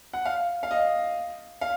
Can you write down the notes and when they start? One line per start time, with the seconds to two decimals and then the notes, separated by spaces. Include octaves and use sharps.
0.13 F#5
0.25 F5
0.63 F5
0.71 D#5
1.61 F5